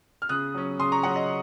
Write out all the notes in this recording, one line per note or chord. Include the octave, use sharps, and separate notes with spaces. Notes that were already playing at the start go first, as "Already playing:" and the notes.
F6
C#3 D#6 F#6
F#3 C#4
C#3 C6 D#6
A#5 C#6
F#3 C#4 F#5 A#5
D#5